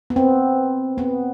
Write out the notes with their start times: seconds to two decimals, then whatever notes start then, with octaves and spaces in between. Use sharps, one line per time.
0.10 B3
0.16 C4
0.98 B3